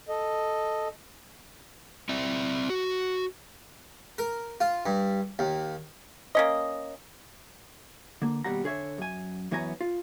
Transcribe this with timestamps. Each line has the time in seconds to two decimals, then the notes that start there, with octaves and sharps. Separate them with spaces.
0.09 A4 D#5
2.09 C4 D5 E5
2.70 F#4
4.18 A#4
4.60 F4
4.86 G2
5.39 D#2
6.35 A#3 C#4 D#5
8.22 D3 A#3
8.44 D#2 B2 G3 F#5 A#5
8.64 D3 G#4 C#5 E5
8.98 F#2 G#5
9.51 F#2 E3 B3 C#5 G#5 A#5
9.81 F4